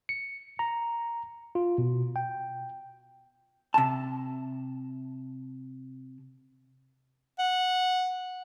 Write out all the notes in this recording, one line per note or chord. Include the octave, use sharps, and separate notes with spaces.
C#7
A#5
F4
B2
G5
C3 A5
F#5